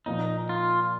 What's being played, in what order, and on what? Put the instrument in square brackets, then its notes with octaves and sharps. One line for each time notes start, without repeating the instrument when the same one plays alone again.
[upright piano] A#2 F3 A#3 [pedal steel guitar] D#4
[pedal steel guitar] F4